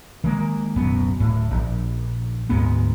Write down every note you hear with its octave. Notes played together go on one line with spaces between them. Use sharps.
D#3 G#3 A#3
D1 F#2 B2 B3
D1 A2
A#1
D2 G#2 G#3 B3